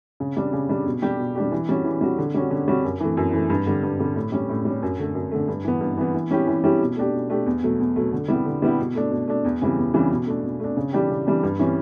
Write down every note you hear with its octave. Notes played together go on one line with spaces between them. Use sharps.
C#3
G3 D4
C#3
G3 D4
B2
G3 D4 G4
B2
G3 D4 G4
E3
G3 C#4 F#4
E3
G3 C#4 F#4
D3
G3 C#4 F#4
D3
G3 C#4 F#4
F#2
E3 A3
F#2
E3 A3
G2
D3 G3
G2
D3 G3
A2
G3 C#4
A2
G3 C#4
F#2
D3 A3
F#2
D3 A3
G2
E3 B3
G2
E3 B3
E3
G3 C#4 E4 G4
E3
G3 C#4 E4 G4
B2
A3 D4 G4
B2
A3 D4 G4
E2
B2 F#3 A3
E2
B2 F#3 A3
D3
G3 B3 E4 G4
D3
G3 B3 E4 G4
B2
A3 D4
B2
A3 D4
E2
C#3 E3 G3
E2
C#3 E3 G3
B2
A3 D4
B2
A3 D4
C#3
E3 G3 D4 G4
C#3
E3 G3 D4 G4
G2
E3 G3 C#4 E4